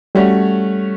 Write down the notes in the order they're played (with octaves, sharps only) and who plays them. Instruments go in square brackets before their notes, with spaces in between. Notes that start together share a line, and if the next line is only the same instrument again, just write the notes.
[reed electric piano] G3 [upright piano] A3 C#4 F#4 C#5